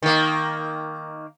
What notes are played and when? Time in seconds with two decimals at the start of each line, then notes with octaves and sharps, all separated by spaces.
0.02 D#3 A#3